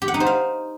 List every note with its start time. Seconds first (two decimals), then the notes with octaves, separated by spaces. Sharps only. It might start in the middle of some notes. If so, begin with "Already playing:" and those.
0.02 G4
0.08 F#5
0.14 D#4
0.20 C5
0.26 F5